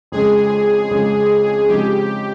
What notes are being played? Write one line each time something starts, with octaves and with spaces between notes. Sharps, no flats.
F2 C#3 G#3 G#4
F2 C#3 G#3
C#3 F3 G#3 C4 D#4 G4